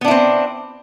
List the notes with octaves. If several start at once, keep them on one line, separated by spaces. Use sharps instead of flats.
B3 C4 D4 E4